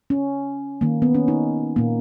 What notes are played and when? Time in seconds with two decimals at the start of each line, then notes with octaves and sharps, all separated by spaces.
0.10 C#4
0.81 D#3 A#3
1.02 B3
1.15 C#4
1.28 D#4
1.76 A#2 A#3